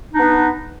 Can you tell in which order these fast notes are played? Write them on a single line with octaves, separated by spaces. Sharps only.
D#4 D4 B3